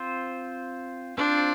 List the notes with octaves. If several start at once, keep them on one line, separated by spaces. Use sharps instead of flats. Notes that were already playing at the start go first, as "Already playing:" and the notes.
Already playing: C4 F4 C5
C4 D4 F4 C5